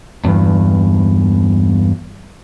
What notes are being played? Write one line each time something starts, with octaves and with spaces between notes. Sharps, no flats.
E2 G2